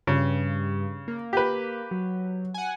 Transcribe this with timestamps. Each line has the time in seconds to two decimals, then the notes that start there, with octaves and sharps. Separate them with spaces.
0.07 G2 C#3
1.08 A#3
1.33 G4 B4
1.91 F#3
2.54 F#5 G#5